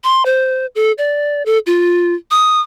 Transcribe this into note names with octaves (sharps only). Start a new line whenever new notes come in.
C6
C5
A4
D5
A4
F4
D#6